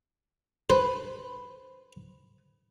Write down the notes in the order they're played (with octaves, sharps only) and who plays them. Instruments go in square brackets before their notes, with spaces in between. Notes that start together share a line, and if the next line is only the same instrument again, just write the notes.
[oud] B4 [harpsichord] C5